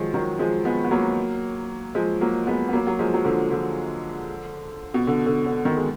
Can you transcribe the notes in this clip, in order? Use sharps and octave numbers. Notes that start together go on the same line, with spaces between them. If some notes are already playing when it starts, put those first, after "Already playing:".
Already playing: D#3 F3 F#3 G#3
D#3 F#3
F3 G#3
G#3 B3
B3
F#3 A#3
F3 G#3
F#3 A#3
G#3 B3
B3
F#3 A#3
F#3
F3 G#3
F#3
D3 F3
D3 F3
B2
D3
D3
D3
B2 D#3
G#3